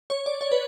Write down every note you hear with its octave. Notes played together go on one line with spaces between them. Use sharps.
C#5
D5
C#5
B4